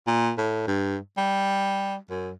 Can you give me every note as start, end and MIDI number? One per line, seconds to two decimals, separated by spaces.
0.07 0.32 46
0.38 0.66 45
0.67 0.97 43
1.17 1.96 55
2.10 2.32 42